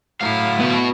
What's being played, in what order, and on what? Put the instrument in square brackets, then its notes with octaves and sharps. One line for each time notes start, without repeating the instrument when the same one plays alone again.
[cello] A2 E4 [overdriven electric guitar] F#3 F5
[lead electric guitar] B3 F#4